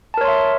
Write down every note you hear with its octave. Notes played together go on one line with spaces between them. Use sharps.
A#4 C#5 E5 A5 C6